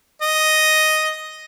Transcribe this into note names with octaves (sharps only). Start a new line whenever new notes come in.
D#5